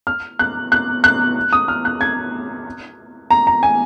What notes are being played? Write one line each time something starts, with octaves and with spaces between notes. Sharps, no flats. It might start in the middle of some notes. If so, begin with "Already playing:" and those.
F6
F#6
F#6
F#6
D#6
F6
F#6
G#6
A#5
A#5
G#5